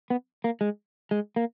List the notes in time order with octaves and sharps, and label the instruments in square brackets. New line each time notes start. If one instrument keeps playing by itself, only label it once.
[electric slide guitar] B3
A#3
G#3
G#3
A#3